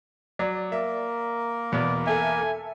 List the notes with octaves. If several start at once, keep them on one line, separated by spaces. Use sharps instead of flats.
F#3 D5
A#3 A#4 E5
E2 B2 B3 D5
A4 E5 G#5